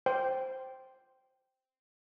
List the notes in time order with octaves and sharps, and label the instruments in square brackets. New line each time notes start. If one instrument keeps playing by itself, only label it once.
[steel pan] C5 G5